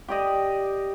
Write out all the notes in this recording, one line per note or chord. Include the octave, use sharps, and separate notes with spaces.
G4 D5 D#5